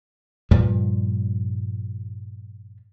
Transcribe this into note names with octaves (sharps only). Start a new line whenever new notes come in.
G2 A#2 F3 G3